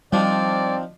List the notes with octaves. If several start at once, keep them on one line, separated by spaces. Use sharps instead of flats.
D#3 F3 G3 C4 D4 D5